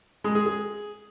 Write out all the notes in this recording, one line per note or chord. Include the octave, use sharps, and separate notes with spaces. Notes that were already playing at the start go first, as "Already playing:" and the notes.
G#3
G#4
G#4